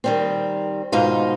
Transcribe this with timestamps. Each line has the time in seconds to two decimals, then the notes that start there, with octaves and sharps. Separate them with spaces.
0.04 D#3 G3 C4
0.92 G#2 B2 D#3 D#4 F4